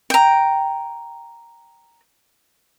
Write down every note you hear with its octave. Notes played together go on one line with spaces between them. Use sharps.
G5 A#5